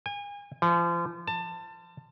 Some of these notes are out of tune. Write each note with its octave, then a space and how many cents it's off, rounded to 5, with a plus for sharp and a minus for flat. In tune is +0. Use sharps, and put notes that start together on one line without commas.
G#5 -35
F3 -35
A5 +20